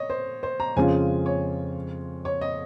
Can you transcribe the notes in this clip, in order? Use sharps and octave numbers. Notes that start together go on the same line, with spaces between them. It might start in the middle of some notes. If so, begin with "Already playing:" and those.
Already playing: C#5 D#5
C5
C5
A#5
F2 C#3 G#3 C#4 F4 G#5
C#5
C#5
D#5